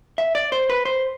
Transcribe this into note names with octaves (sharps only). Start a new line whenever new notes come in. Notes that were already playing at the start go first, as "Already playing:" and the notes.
E5
D5
C5
B4
C5